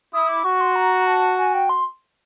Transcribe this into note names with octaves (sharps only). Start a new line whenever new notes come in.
E4 D#6
D6
F#4 C#6
C6
A#5
A5
G#5
G5
C6